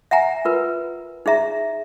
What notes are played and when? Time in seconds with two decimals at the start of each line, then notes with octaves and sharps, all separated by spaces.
0.11 E5 F#5 G#5 A#5
0.45 F4 A#4 B4
1.26 D#4 G#4 E5 A#5